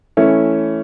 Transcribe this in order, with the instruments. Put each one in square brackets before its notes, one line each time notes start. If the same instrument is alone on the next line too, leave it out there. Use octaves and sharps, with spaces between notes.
[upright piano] E3 A3 C#4 E4